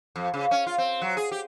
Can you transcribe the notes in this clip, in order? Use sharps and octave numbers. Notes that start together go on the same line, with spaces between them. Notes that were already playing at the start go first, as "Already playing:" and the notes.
F2
C#3
C#4
F4
C4
F#3
G#4
G4